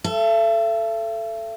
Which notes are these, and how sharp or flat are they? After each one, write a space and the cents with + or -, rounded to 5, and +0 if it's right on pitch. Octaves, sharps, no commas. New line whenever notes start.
A4 +0 E5 +40